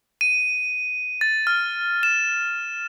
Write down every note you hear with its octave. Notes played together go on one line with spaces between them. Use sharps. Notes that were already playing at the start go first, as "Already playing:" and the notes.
D#7
A6
F6
E7